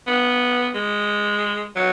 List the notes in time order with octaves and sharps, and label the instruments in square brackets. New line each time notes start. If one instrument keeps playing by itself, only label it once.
[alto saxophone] B3
G#3
F#3